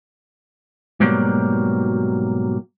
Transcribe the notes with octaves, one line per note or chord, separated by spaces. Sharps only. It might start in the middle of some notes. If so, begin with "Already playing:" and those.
G#2 B2 F#3 G3 A#3